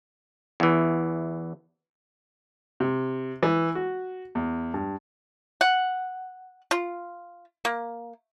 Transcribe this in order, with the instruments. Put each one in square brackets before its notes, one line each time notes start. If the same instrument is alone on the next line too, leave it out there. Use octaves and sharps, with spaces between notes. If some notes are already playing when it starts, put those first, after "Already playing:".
[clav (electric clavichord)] E2 E3
[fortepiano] C3
E3
F#4
E2
G2
[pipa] F#5
F4
A#3